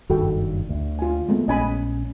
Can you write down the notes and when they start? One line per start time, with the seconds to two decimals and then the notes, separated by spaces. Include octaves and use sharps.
0.10 F#1 G2 D#3 F#4 A4 G5
0.69 D2
0.99 F4 G#5
1.29 G#3 A3 B3
1.48 A#1 C#4 D#5 G#5 B5